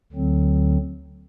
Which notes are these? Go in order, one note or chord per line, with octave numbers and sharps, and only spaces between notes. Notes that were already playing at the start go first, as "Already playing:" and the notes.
D2 D3 F#3 C4